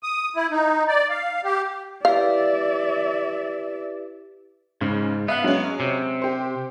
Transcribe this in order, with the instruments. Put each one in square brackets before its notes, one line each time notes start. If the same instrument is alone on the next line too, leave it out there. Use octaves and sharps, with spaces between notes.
[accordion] D#6
E4
D#4
D5
F5
G4
[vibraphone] E4 G4 B4 [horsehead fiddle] D5 E5 [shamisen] F5
[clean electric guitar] G#2 [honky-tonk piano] C#3
[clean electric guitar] B3 [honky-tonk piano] E5 F5 F#6
[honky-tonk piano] F#3 G#3 C#4
[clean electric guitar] C3
[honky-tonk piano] G4 C5